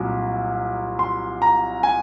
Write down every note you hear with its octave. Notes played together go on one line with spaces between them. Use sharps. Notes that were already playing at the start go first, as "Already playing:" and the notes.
Already playing: C2 A#2 F#3
C6
A#5
G#5